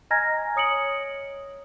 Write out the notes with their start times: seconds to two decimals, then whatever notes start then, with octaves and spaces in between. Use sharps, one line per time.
0.11 D#5 G#5 A#5 F6 G#6 A#6
0.56 C#5 D#6 C#7 D7 F#7